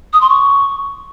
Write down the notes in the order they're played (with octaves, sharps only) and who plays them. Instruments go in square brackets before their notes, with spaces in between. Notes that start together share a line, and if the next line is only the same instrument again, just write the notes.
[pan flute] D#6
C6
C#6